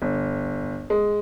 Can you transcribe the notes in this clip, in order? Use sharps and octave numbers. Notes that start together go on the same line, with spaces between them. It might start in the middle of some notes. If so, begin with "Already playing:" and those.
G1
G#3